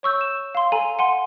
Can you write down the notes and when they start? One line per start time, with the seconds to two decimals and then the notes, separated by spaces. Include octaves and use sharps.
0.03 C#5 C#6 E6 G6
0.21 E7
0.55 F5 C6
0.72 A4 G#5 A#5 D#7
0.99 F#5 G#5 C6